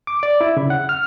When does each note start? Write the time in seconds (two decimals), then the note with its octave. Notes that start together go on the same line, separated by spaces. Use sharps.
0.07 D6
0.23 D5
0.41 E4
0.57 C#3
0.70 F#5
0.89 F6